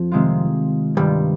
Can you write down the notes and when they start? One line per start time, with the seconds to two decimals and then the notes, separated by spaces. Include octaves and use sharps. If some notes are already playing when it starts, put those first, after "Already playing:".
Already playing: F2 F3
0.11 C3 D#3 G#3 C4 F4
0.97 G2 C3 D#3 G3 G#3 C4 F4